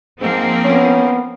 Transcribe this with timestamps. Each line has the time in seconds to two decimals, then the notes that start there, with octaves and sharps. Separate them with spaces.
0.22 G#2 F3 A#3 C4
0.64 B3 C#4